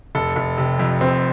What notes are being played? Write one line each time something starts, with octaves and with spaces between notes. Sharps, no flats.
F1 A4
F1
C3
F2
F1 C4